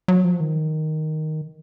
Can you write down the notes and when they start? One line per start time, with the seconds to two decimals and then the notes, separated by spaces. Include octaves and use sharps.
0.08 F#3
0.24 F3
0.40 D#3